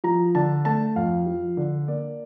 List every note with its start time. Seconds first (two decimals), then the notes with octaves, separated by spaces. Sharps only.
0.04 F3 A#5
0.35 D3 A5
0.65 A3 A5
0.96 F2 F5
1.26 F3
1.57 D3
1.88 A#3 D5